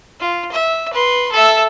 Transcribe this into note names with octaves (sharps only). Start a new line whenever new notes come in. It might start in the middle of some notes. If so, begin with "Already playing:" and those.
F4
E5
B4 C6
A4 E5